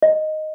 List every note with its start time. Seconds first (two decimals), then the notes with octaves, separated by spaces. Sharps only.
0.03 D#5